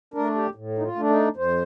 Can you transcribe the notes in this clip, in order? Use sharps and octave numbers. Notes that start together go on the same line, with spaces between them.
A3 D4 A#4
G4
A2
D#4
F4
A3 D4
D#4
F2 C5